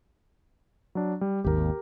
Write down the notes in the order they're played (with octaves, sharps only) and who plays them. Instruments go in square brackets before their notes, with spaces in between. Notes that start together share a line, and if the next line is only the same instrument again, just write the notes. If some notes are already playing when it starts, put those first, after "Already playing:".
[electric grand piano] F#3 D4
G3
[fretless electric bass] G#1 D#2 [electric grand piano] G4 A#4